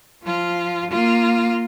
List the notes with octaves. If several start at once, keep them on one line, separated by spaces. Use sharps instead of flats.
F3 F4
A#3 F4